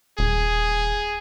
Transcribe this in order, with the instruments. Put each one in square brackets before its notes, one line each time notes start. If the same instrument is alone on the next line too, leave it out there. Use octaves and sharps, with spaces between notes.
[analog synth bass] D#1 [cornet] G#4